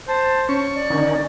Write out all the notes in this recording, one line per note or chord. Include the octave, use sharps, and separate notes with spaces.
C5 A5
C#4 C#6
D5
D3 D#3 C#4 D#4